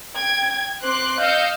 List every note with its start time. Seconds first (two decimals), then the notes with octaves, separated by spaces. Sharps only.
0.17 G5 G#6
0.82 C4 C5 C6 D6 F#6
1.19 D#5 F5 E6 G6 C#7